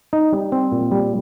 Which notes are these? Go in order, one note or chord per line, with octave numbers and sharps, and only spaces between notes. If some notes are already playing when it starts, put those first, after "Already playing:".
D#4
G3
C4
A#2
G3